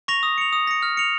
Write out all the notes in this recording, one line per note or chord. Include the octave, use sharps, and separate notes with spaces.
C#6 A#6 F7
D#6
C#7 F7
D#6
A#6 C#7
F6
C#7 F7